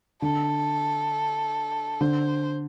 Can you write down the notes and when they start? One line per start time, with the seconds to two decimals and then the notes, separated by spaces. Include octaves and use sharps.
0.22 D3 A4
2.01 D3 C5